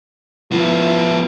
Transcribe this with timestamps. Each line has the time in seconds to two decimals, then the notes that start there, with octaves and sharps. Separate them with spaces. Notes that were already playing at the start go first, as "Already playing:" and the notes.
0.51 F3 B3 E4